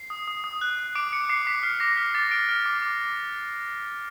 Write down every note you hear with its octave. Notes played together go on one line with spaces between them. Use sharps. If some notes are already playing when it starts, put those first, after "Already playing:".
Already playing: C7
D#6
D#6
D#6
F#6
F#6
D6 D7
D6 C#7
D6 C7
D6 B6
F6 C7
D6 A#6
F6 B6
D6 A6
F6 D7
F6
D6
D6